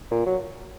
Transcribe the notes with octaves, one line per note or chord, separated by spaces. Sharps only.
A#2
F#3